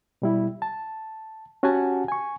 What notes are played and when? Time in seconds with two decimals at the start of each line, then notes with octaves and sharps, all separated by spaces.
0.22 B2 G3 E4
0.62 A5
1.63 C#4 F#4 G4 F#5 G#5 A5
2.08 G#5 C#6